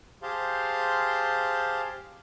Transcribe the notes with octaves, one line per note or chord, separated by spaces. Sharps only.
G4 G#4 C5 F5 A5 C6